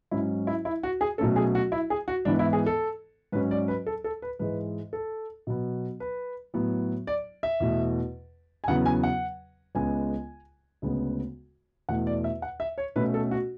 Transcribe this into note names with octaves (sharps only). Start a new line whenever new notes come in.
G#2 F#3 C#4 E4
E4
E4
F#4
G#4
B2 F#3 A3 C#4 A4
G#4
F#4
E4
G#4
F#4
G#2 E3 B3 D4
E4
G#4
A4
G#2 F#3 C#4 B4
D5
B4
A4
A4
B4
G#2 E3 G#3 B4
A4
B2 F#3 B3
B4
A2 F#3 B3
D5
E5
E2 B2 A3
G#5
E2 C#3 F#3 B3 F#5
G#5
F#5
C#2 C#3 G#3 B3 G#5
D2 C#3 G#3 B3
E2 B2 A3 F#5
D5
E5
F#5
E5
C#5
B2 A3 C#4 B4
A4
F#4